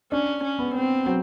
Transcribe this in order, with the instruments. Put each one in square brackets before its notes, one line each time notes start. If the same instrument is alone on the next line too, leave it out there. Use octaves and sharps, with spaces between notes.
[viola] C#4 [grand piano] D4
[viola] C#4
[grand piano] B3
[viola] C4
[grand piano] F#3